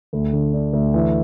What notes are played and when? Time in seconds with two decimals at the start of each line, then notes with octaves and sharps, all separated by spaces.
0.13 D2
0.33 D3
0.54 D4
0.73 D2
0.94 E3